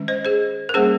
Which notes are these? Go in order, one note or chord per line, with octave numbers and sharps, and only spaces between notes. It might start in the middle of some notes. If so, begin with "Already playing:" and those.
Already playing: D#3 G#3 C#4
C5 D#5
G#4 C5
A#4
G3 A#3 C#4 G#4 C5